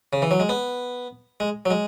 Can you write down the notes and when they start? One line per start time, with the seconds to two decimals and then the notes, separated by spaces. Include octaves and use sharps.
0.13 C#3
0.22 E3
0.31 F#3
0.40 G#3
0.49 B3
1.40 G#3
1.66 F#3
1.71 G#3